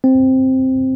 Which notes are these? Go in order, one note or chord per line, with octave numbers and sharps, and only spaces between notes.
C4